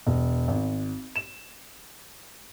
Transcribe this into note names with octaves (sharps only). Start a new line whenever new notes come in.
E1
G#1
E7